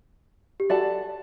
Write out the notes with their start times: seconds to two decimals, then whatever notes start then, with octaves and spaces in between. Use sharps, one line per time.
0.60 G4
0.70 F#4 A4 D5 F#5 A5